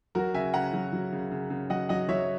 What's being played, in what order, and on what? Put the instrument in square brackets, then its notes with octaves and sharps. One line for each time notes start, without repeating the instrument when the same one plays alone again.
[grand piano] F#3 F#4 A#4
C#3 E5 G#5
C#3 F#5 A#5
F#3
F#3
C#3
C#3
C#3
F#3 D#5 F#5
F#3 D#5 F#5
F#3 C#5 E5